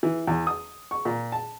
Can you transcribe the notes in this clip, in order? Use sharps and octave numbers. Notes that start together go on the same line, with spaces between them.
E3
E2
D#6
C#6
A#2
A5